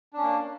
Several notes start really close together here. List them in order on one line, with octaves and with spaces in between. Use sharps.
D4 C#4 A#3